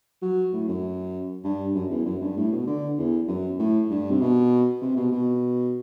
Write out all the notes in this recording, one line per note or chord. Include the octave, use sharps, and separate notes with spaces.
F#3
A2
F#2
G2
F#2
E2
F#2
G2
A2
B2
D3
E2
F#2
A2
G2
C3
B2
C3
B2
B2